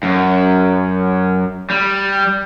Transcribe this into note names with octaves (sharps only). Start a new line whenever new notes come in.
F#2
G3